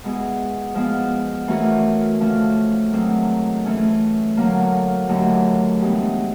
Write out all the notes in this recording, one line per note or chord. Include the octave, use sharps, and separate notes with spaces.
B2 G#3 B3 E4 G#4
F3 G#3 B3
E3 A3 C#4 F#4 A#4
D3 F3 A3 C#4
G#2 D#3 F#3 A3 C4
E3 A3 C#4
D3 F#3 A#3
D#2 D3 F#3 A3
G2 E3 G#3 B3